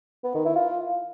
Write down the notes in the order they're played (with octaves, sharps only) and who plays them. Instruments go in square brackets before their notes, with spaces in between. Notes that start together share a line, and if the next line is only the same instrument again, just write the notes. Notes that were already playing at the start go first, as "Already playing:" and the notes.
[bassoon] B3
D#3
E4
F4